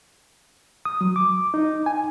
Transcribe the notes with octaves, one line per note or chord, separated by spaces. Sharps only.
D#6
F#3
D6
D#4
G#5